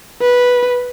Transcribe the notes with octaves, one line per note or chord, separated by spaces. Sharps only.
B4